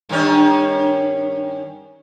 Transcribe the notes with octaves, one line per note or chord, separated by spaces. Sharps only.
G2 D#3 C#4